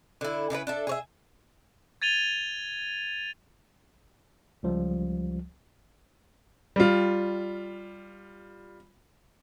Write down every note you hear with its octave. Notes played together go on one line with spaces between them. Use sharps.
D3 E4
C#3 D4 E4 B4
D4 A4 E5
G#4 C#5 E5
G#6 A6 D#7 F7 G7
C#2 F3 G3
G3 F4